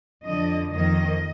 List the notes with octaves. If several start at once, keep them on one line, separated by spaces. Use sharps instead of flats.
F2 D3 F3 D#5
F2 D#3 A#3 D#5